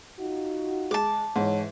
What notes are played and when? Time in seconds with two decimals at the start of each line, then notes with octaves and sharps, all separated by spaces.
0.19 D#4 F4 F#4
0.91 G#3 A5 D6
1.36 G#2 E3 C#5